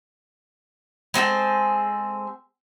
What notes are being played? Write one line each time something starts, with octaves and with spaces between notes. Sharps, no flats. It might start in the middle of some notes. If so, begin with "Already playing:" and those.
G#3 C4 G#4 A4